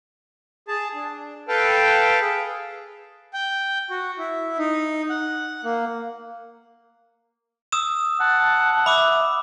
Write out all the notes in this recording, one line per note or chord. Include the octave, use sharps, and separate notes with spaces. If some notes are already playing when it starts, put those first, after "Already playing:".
G#4 A5
D4
A4 B4 F5 G5 A5
G#4
G5
F#4
E4
D#4
F#5
A#3
D#6 E6 E7
F#5 A5
E5 B5 D6 E6